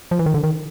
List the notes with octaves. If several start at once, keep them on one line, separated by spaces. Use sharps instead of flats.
F3
E3
D#3
D3
D#3